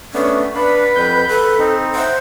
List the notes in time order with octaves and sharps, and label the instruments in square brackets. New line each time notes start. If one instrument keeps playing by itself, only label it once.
[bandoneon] A3 B3 D4 [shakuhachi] C#4
[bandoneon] D4 [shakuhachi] B4 [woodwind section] F5 F#5 B5
[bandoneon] F2 G6
[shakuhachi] A4 [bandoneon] B4
[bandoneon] C4 D#4
[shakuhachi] C5 [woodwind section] C#5 E5 F#5